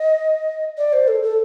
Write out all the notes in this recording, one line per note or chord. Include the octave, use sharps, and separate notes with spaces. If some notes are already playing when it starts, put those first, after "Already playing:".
Already playing: D#5
D5
C5
A4
A4